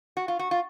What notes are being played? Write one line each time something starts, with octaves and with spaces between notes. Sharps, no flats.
F#4
F4
F#4
F4